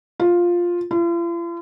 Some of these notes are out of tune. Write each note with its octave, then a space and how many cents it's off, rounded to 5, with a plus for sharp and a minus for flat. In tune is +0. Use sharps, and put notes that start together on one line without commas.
F4 +5
F4 -45